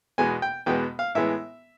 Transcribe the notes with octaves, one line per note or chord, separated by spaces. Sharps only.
E2 B2 G#3 B3 G#5
G5
E2 B2 G#3 B3 G5
F5
A2 E3 G#3 B3 E5